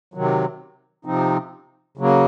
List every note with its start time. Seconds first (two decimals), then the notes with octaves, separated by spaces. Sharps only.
0.14 C3 D#3 F#3
1.05 C3 F3 C4 D#4
1.97 C#3 F#3 A#3